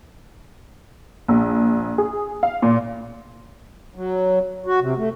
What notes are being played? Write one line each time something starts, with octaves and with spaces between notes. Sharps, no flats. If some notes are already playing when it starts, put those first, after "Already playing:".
A#1
G#4
F5
A#2
F#3
F#4
C3
A3